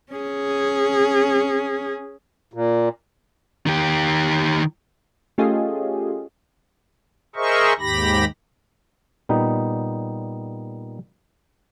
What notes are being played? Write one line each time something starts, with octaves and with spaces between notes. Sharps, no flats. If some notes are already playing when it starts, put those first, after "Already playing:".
C#4 G#4
A#2
D#3 G4
A3 C#4 F4 G4 G#4 D#5
G#4 A#4 C5 D#5 E5 C#6
D#2 G#2 G4 B5 A#6
A#2 G3 B3 D#4